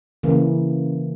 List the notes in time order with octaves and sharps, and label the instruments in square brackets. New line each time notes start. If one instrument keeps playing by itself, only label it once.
[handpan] C#3 E3 A#3